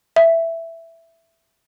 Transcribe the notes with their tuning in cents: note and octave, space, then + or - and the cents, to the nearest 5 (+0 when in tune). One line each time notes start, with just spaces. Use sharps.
E5 +5